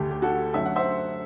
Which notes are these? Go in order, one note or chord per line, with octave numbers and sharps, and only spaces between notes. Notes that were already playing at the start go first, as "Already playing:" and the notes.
Already playing: D2 D3 A3 G4
G4
F#4 A4
F#2 D3 F#3 A3 E5
F#5
C5 E5